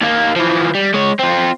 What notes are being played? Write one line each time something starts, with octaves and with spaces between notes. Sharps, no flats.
D#2 A#3
E3 F3
G3
G#3 C#5
C4 F4